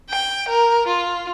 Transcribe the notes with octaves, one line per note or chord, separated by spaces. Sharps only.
G5
A#4
F4